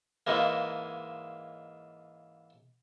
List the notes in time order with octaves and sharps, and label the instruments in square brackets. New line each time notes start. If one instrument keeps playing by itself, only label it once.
[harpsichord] G#2 C#3 E3 G#3 A#3